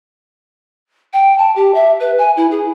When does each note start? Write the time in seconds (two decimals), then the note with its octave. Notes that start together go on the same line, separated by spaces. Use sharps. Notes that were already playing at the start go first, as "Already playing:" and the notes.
1.13 G5
1.38 A5
1.56 G4
1.74 E5
2.00 B4
2.18 G#5
2.37 E4
2.51 G#4